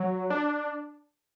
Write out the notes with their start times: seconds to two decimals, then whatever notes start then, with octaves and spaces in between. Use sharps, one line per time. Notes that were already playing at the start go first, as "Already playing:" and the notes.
Already playing: F#3
0.30 D4